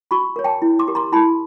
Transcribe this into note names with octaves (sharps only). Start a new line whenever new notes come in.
F#4 B5 C#6
A#4 C#5
G5 A5
E4
C6 D6
G4 A#4
A#5 C6
E4 A5 B5